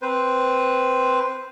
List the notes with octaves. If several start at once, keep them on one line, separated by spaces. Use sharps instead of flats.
C4 B4 C5